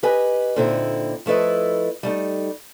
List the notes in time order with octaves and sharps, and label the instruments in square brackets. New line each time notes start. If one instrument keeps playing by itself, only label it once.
[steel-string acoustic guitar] G4 B4 D#5 G#5
A#2 D3 C4 D#4 E4
F3 A3 E4 B4 D#5
G3 A3 D#4